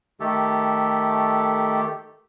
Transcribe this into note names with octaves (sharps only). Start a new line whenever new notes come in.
D#3 A3 G4 A4